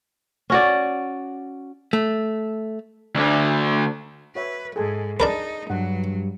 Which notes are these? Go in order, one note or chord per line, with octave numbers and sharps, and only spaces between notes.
C#4 F#4 D5
A3
D2 D3
F#4 B4 C#5 E5
G#2 G#4 A4 G#5
D4 D#4 G#4 A#4 B4 A5 B5
G2 F#3 F#5